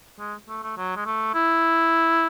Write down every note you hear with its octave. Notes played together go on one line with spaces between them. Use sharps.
G#3
A3
A3
F#3
G#3
A3
E4